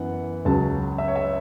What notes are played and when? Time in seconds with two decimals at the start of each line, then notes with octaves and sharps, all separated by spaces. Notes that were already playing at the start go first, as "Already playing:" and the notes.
Already playing: F#2 E3 B3 F#5
0.45 C#2 C#3 F#3 A5
0.98 E5
1.08 C#5
1.16 E5